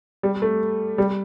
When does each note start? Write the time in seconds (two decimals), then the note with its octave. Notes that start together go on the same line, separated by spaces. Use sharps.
0.23 G3
0.42 A3
0.98 G3